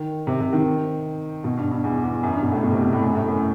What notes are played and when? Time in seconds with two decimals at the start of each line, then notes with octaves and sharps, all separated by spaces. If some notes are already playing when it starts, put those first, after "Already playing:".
Already playing: D#3
0.27 C3
0.40 C3
0.53 D#3
1.44 B2
1.57 G2
1.71 G2
1.84 E2
2.04 E2
2.23 F#2
2.33 G2
2.42 B2
2.52 A2
2.63 B2
2.72 C3
2.82 B2
2.93 A2
3.02 F#2
3.15 A2
3.28 F#2